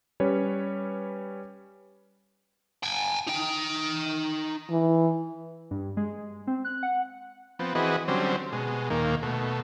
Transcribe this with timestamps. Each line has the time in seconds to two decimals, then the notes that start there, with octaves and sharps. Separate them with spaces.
0.20 G3 C#4 B4 C#5
2.83 G5 G#5
3.27 D#4 G5
4.70 E3
5.71 G2
5.97 G#3
6.47 C4
6.65 F#6
6.83 F#5
7.59 F3 B3 C4
7.75 E3 C4 F#4 G#4 B4 D#5
8.08 D3 F#3 G3 C4 C#4 C5
8.52 B2 G#3
8.90 D#2 A#2 D#3 A#3
9.23 B2 A3